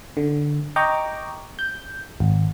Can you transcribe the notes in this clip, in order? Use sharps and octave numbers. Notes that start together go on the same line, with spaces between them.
D3
D#5 G5 A#5 C#6 D6
G6
G#1